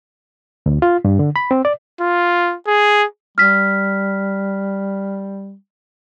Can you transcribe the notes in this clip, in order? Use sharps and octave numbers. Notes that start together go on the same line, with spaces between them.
D2
F4
G2
D3
B5
C4
D5
F4
G#4
G3 F6 B6